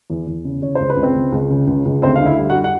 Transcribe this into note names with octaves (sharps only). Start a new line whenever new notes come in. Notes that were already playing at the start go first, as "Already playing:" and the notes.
E2
E2
C#3
C#3 C#5
C#2 C5
B4
C#2
C4 C5
C#2
C#2
C#3
C#2
C#2
D2 C4 C5
F5
D3
E4 E5
G3
F#4 F#5
G3
F#5